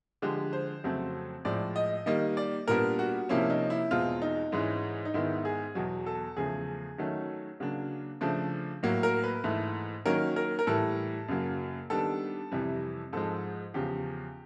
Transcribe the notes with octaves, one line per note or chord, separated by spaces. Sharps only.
D3 F3 G#3 G4
C5
F2 C#3 F#3 A3 C4
A2 F3 G#3 D5
D#5
D#3 G3 A#3 D#5
D5
A#2 G3 B3 D4 A#4
F#4
C3 F3 A#3 C#4 E4
D#4
E4
E2 B2 G#3 C4 F4
D#4
G#2 E3 G#3 C#4
D#4
G#2 D#3 G#3 B3 E4
G#4
E2 B2 F#3
A4
E2 C#3 F3 A3 G#4
D#3 F#3 A3 C#4
C#3 F#3 A#3 D4
C#3 F3 A3 D4
A2 F#3 A#3
A#4
B4
G#2 E3 A3
D#3 F#3 A#3 C#4 A#4
A#4
A#4
A2 E3 G3 A4
F#2 C#3 F#3 A#3
D#3 G3 B3 D4 A4
F2 C3 E3 G3
G#2 F3 G#3 A4
E2 C#3 F3 G4